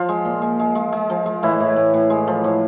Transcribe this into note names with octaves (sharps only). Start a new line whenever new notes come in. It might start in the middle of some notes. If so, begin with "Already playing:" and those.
Already playing: F3 F4
G#3
A#2
G#3
G#3
G#3
G#3
F3
G#3
A2 E3 E4
A2
A2
A2
G#3
F3
A2